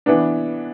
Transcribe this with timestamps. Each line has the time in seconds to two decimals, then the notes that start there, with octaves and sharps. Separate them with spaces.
0.06 E3 B3 D4